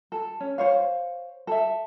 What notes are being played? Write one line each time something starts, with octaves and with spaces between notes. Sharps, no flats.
A4
C#4
C5 C#5 F5
A4 E5